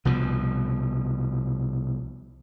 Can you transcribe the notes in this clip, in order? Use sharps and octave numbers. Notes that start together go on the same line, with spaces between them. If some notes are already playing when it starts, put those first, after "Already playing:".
C2 B2 F3